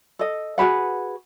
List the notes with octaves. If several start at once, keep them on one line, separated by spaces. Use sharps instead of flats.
A4 D#5
F#4 G#4 B4 F#5